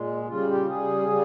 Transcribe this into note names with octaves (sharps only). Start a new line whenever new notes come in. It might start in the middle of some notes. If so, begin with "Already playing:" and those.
Already playing: A#2 G#3
C#3 G3 F4
G4
C#3 G3 G#4
C#3 G3